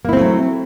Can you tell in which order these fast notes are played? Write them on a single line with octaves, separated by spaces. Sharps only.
A#3 E4 C4 A3 F#3